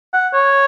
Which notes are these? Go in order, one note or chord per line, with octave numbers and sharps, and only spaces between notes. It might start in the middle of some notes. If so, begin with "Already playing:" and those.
F#5
C#5